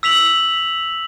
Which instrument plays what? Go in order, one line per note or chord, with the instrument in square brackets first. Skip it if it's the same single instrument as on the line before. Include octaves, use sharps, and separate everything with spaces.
[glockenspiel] E6 B6 F7 F#7